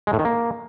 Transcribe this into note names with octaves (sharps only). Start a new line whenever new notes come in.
G#3
A2
D#3
A#3